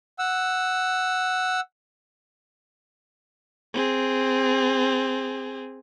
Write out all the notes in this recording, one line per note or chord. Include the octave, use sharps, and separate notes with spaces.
F#5 E6
C4 G#4